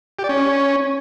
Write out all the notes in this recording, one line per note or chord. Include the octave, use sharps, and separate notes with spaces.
G4
D5
C#4